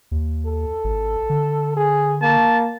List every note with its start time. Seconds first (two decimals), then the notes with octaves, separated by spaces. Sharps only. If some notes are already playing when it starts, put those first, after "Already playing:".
0.11 D#2
0.45 A4
0.84 G#1
1.30 D3
1.76 G#4
2.21 A#3 A5